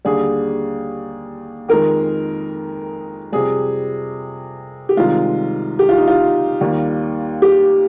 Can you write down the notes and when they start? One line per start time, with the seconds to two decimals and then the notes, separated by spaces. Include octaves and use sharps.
0.05 D#2 D3 G3 G#4
1.68 F2 D#3 G#3 A#4
3.32 F2 C3 G3 G#4
4.89 G4
4.97 C2 C3 D#3 G#3 F4
5.79 G4
5.89 F4
5.97 D#4
6.08 F4
6.61 D#2 D#3 G3
7.42 G4